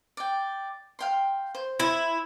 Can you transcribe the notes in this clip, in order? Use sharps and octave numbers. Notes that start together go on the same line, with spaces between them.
D5 G5
F5 G5 C6
C5
E4